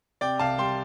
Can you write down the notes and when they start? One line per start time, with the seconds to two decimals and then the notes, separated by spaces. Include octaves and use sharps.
0.21 C3 D5 G5
0.39 C2 F5 A5
0.58 G3 G5 C6